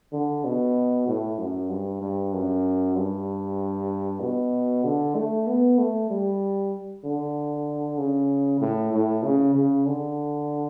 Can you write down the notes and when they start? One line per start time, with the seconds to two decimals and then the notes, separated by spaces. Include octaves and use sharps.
0.13 D3
0.45 B2
1.08 A2
1.38 F#2
1.70 G2
2.02 G2
2.33 F#2
2.96 G2
4.21 B2
4.84 D3
5.15 A3
5.47 B3
5.78 A3
6.10 G3
7.04 D3
7.98 C#3
8.60 A2
8.93 A2
9.23 C#3
9.55 C#3
9.86 D3